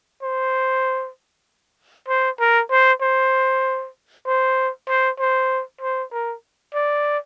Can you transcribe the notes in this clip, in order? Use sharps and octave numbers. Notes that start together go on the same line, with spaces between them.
C5
C5
A#4
C5
C5
C5
C5
C5
C5
A#4
D5